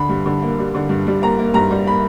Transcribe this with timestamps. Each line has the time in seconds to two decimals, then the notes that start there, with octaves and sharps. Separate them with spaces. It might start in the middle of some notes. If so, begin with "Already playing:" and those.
Already playing: D3 B5
0.09 G2
0.26 D3
0.42 A#3
0.58 G3
0.74 D3
0.89 G2
1.07 G3
1.22 A#3 A#5
1.38 A#3
1.54 G2 A#5
1.71 G3
1.86 A#3 B5